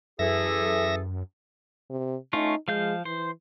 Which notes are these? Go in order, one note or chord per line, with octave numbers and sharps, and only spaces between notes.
F#2 E3 G#4 A4 E5 A#6
C3
A3 C#4 D#4 F4
F3 G#3 F5 G6
E3 C5